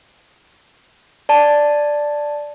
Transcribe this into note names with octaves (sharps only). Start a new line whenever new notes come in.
D5 A5